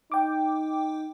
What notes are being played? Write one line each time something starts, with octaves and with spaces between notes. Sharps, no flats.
D#4 G5 D6